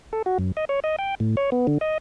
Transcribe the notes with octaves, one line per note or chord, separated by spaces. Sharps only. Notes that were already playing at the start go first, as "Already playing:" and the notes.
A4
F#4
F#2
D#5
C#5
D#5
G5
A2
C#5
B3
D3
D#5